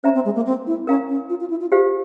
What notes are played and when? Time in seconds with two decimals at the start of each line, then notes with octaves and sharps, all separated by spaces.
0.04 C#4 C5 E5 A#5
0.15 C4
0.25 G#3
0.35 A#3
0.46 C4
0.67 E4
0.87 C#4 A#4 F5 A#5
1.09 C#4
1.29 F4
1.40 F4
1.50 E4
1.61 F4
1.71 F4 G4 C5 F5